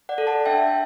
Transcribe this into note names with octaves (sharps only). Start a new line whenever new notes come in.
D5 F#5
A4
F#5 A5
D4 E5 G5